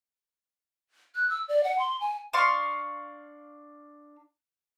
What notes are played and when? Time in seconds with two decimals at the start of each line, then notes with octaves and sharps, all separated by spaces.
1.15 F#6
1.30 E6
1.48 D5
1.64 F#5
1.79 C6
2.01 G#5
2.33 D4 F5 C6 C#6